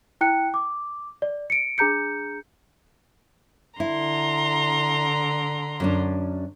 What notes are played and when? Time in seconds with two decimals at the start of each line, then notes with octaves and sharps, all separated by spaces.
0.21 E4 G5 F#6 C#7
0.54 D6
1.22 D5
1.50 C#7 D7
1.78 D4 G#4 A#5 G6 C#7
3.80 D3 E4 A#5 C6
5.80 F#2 C#4 D4